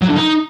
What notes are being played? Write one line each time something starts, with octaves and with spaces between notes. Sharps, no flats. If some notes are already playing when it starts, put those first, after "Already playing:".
F#3
D3
D#4